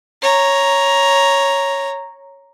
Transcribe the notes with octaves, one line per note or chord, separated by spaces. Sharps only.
C#5 A#5